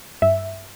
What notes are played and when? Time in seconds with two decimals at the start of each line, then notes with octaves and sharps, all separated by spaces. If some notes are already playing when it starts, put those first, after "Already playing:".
0.22 G2 E5